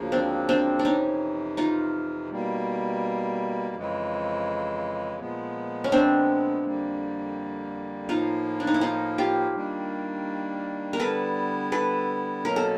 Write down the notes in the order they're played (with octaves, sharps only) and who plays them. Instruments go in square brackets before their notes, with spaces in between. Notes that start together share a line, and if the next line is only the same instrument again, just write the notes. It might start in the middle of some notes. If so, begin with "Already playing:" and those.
Already playing: [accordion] D2 C#3 F3 A#3
[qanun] C4 D4
C4 D4
D4
[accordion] F2 C3 E3 [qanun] C#4 D#4
[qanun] D#4 F4
[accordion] B2 G3 A#3
F2 C#3 E3 G#3
A#2 F3 G#3 B3
[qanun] C#4
C4 D4
[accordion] F2 D3 G3 A#3
[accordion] A2 F3 A#3 [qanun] D#4 F4
[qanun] D4
D#4
E4
D#4 F4
F4 G4
[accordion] D#3 G3 A#3 D4
[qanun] A#4
[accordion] D3 G3 B3 E4 [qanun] A4 B4
[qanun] A4 B4
[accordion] B2 F#3 A#3 C#4 [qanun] A#4
[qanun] A4